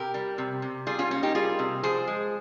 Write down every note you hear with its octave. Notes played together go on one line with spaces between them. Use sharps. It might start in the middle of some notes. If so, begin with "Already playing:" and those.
Already playing: C3 G4 A#4
G3
C3
C3
G3 F4 G#4
C#4 F4
A#3 C#4
D#4 G4
G3 F4 G#4
C3
F3 G#4 C5
G#3